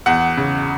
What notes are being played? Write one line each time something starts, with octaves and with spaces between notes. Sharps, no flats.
E2 F#5
C#3